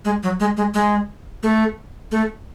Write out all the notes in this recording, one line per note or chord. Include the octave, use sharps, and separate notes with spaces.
G#3
F#3
G#3
G#3
G#3
A3
A3